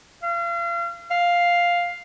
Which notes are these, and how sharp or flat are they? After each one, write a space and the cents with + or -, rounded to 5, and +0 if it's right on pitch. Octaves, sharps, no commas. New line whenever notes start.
F5 -35
F5 +5